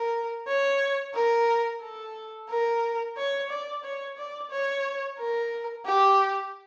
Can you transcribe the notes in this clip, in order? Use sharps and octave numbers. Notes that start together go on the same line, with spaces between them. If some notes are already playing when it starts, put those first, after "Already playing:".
Already playing: A#4
C#5
A#4
A4
A#4
C#5
D5
C#5
D5
C#5
A#4
G4